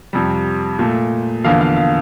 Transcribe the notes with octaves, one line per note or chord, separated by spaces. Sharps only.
F2 C3 G3
A#2 A3
E2 D3 F3 A#3 F5
F5
F5